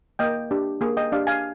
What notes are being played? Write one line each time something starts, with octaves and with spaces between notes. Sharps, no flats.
A#3 D#5 G5
D4 G4
A#3 G#4
D#5 G5
D4 G4 D5 F5
F5 G#5